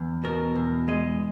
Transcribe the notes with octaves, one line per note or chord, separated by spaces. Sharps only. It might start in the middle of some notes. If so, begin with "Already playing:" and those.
Already playing: E2
B2 A#4
E2
G#3 D#5